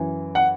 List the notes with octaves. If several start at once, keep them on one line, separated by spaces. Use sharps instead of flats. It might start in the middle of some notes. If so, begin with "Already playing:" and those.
Already playing: F#2 E3
F#5